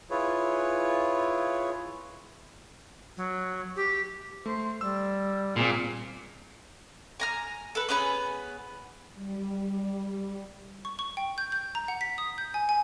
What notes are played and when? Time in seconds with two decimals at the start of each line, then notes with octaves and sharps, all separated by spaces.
0.10 E4 F4 G#4 B4 C#5
3.17 F#3
3.76 G4
4.46 A3 C5
4.81 G3 E6
5.56 A#2 A#3 C4 G#4
7.20 G#5 A#5 F6
7.75 A4 B4
7.89 B3 C#4 G#4 B4
9.15 G3
10.85 C#6
10.99 C#6
11.17 G5
11.38 G6
11.52 G6
11.75 A#5
11.88 F#5
12.01 B6
12.18 D#6
12.38 G6
12.54 G#5
12.69 G#5